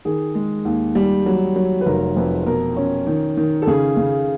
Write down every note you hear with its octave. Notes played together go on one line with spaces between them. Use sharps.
D#3 G#4
G#3
D#2
G3
F#3
F#3
B4
F1 A#4
F2 B4
B2 A#4
C#4
D#3
D#3
A4
C#3 G#4
C#3